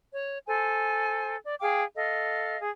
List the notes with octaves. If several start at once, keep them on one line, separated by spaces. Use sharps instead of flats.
C#5
A4 C5 G#5
D5
G#4 F5 G5 D6
A4 D#5 F5
G#4